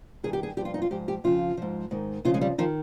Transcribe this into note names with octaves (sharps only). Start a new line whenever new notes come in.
G2 D#3 G#4
G4
G#4
G2 F3 F4 G4
D#4
F4
G#2 F3 G4
G4
F2 C#3 F3 F4
G#2 F3
G#2 D#3
F2 C#3 F3 F4
G#3
G3
D#3 F3